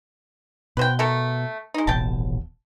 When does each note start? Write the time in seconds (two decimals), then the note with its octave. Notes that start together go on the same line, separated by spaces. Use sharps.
0.77 B2 B4 C5 G5
0.99 A3 A4 A#4
1.74 G#3 D#4
1.87 D#1 A1 B2 G5 A5